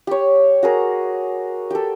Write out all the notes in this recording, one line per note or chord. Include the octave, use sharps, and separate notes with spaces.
G4 C#5
F#4 G#4 A#4
G4 A4